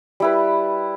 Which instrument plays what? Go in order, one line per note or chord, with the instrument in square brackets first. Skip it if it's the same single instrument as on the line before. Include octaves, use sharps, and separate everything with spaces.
[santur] G3 E4 B4